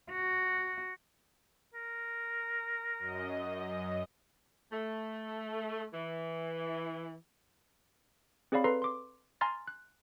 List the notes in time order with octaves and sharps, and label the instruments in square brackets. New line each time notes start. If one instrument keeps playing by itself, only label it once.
[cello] F#4
[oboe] A#4
[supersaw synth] F#2 D#5
[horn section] A3
E3
[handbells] C4 G#4 C#5 D5 F5 B5
A4 B4 A#5 C6 C7
C6 D6
G#5 A#5 C6 F6 A6
F#6